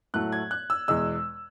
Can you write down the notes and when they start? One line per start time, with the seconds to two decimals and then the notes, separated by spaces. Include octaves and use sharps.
0.14 A2 F#3 A3 F#6
0.32 G#6
0.51 F#6
0.70 E6
0.88 E2 B2 G#3 E6